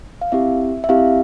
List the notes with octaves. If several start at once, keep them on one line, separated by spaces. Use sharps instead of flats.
F5
C4 E4 G4 E5
E5
C4 E4 G4 F5